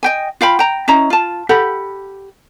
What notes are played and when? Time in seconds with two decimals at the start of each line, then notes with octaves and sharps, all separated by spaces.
0.03 D#5 G5 G#5
0.41 F4 F5 G5 B5
0.59 G5 A#5
0.88 C#4 E4 D#5 A#5
1.10 F4 A5
1.49 G4 A4 F#5 B5